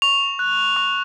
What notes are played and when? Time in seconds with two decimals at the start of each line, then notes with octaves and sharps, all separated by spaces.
0.02 C#6 F7
0.39 F#6
0.76 C#6